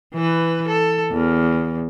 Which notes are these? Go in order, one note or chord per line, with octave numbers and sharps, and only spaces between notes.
E3 B4
A4
E2